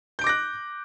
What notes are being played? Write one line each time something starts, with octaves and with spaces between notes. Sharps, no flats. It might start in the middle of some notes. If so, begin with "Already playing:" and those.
D6 F#6 G6 A#6 D7